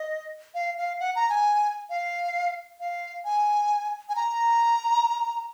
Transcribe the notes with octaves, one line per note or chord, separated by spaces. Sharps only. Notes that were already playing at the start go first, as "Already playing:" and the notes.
Already playing: D#5
F5
F5
F#5
A#5
G#5
F5
F5
G#5
G#5
A#5